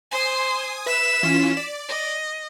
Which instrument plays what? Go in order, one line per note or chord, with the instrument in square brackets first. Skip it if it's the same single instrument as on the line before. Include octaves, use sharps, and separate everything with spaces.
[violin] C5 C6 [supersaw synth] G#5 D#6
[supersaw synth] B4 E5 [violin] B6 E7
[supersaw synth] E3 C#4 F4
D5
[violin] D#5